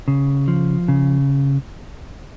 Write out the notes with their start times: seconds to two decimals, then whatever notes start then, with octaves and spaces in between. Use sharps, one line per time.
0.08 C#3
0.48 F3
0.88 C#3